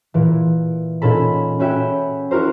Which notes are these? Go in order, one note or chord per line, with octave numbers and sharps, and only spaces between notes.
A#2 E3
A#2 C#4 D#4 A4 B5
C#4 F#4 E5 G5 B5
E4 F#4 A#4 C5